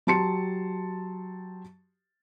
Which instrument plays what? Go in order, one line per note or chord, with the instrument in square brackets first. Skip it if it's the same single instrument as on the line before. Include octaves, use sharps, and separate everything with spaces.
[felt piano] F#3 G4 A5 C6 C#7